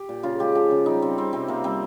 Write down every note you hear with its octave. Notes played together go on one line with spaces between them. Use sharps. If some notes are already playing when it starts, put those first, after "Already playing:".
Already playing: G4
A#2
C#3 F4
G#3 G4
F3 G4
C#3
G3 D#4
G3 C4
G3 C4
C3 C4
C3 A#3
G3 C4